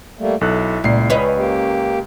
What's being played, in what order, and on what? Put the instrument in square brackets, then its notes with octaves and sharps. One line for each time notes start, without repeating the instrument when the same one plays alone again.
[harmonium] G3 A3 A#3
[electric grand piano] B1 A4 F#6 [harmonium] E4
[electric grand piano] C#2 C7 [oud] A#2
[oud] C#4 B4 D#5
[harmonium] A#3 G4